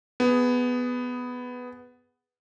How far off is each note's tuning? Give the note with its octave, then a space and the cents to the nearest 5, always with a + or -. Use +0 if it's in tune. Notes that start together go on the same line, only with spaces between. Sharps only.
B3 +5 G#4 +0